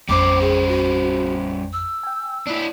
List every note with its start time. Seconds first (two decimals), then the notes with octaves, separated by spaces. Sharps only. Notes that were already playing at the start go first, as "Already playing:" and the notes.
0.09 A1 F2 G3 C#4 C5 D6
0.41 G#4
0.68 F#4
1.73 E6
2.03 G5 G#5
2.47 D4 E4